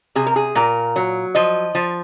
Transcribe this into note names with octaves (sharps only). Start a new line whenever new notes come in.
C3 G#4
A#4
G#4
A#2 A#4
F#3
F3 D#5
F3